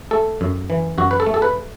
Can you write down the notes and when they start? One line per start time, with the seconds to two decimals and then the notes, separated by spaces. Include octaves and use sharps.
0.11 A3 A4
0.41 F#2
0.70 E3
0.98 F#2 F#4
1.11 B4
1.20 A4
1.27 A3
1.34 A4
1.42 B4